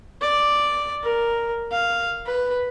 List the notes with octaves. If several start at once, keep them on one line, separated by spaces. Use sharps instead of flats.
D5
A#4
F5
B4